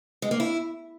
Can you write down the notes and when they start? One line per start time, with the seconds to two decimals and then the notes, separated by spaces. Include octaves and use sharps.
0.22 G#3
0.31 A#3
0.40 E4